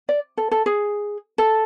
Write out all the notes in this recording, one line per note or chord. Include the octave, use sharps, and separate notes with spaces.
D5
A4
A4
G#4
A4